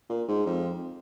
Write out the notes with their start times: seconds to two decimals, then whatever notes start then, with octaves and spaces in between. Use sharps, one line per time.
0.10 A#2
0.28 G#2
0.46 F2